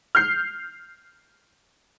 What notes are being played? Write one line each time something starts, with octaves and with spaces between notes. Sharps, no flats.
F6 G6 C7